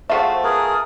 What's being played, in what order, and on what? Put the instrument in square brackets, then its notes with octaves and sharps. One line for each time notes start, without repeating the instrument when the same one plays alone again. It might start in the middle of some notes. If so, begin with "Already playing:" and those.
[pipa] A3 F4 F#4 [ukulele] G#4 E5 [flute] C5
[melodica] G#4 A#4 [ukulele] B4 [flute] D#6